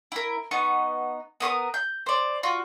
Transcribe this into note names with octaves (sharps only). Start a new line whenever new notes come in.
E4 A#4
B3 D#4 C#6
B3 A#4 C#6 D#6
G6
C5 D5
F4 F#4